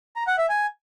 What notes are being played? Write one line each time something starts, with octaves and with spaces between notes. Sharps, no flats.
A#5
F#5
E5
G#5